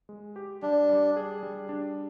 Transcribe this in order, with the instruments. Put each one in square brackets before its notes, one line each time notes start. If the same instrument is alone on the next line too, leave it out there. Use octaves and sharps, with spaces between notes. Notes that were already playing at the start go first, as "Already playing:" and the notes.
[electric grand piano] G#3
G4
[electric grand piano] G3 [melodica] D4
[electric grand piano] G3
G#4
G3
D4